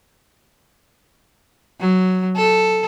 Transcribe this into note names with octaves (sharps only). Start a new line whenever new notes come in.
F#3
A4